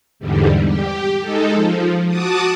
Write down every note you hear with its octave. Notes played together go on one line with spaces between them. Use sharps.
E2 G#2 D3 G3
G4
G#3 D#4 A4
F3
F#4 A5 D6 D#6